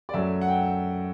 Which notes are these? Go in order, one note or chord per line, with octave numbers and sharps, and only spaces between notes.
D5
F#2 F#3 A3 E5
F#5
G5